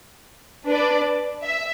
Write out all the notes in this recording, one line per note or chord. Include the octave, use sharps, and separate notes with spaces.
D4 B4 D5
E5